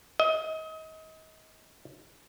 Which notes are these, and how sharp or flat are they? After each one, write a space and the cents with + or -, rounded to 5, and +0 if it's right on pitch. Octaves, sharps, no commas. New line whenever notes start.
D#5 +30